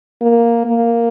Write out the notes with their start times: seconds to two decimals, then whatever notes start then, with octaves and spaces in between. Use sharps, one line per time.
0.22 A#3
0.66 A#3